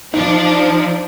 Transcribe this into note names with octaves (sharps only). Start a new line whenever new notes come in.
F3 D4 D#4